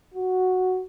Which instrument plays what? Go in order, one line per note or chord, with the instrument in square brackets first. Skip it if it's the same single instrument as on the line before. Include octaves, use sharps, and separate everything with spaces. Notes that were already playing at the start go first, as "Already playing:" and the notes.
[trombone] F#4